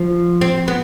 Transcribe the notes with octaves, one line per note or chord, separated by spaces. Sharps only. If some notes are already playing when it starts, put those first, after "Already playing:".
Already playing: F3
C4
B3